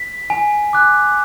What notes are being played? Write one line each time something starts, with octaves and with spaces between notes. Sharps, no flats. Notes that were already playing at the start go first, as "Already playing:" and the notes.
Already playing: B6
G#5
D6 F#6